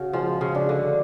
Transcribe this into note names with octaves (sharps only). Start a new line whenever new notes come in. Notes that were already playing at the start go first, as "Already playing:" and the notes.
Already playing: C#3 F#4
F3 G#3
C#3
D4
D3